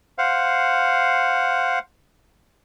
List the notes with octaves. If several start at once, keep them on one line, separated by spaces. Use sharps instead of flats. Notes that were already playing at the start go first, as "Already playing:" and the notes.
C5 F5 F#5